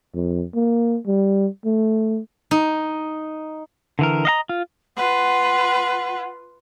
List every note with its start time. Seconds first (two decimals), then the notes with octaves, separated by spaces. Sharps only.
0.14 F2
0.55 A#3
1.07 G3
1.65 A3
2.51 D#4
3.99 D3 E3 A#4
4.25 D#5 F5 A#5
4.49 F4
4.97 F4 B4 F#5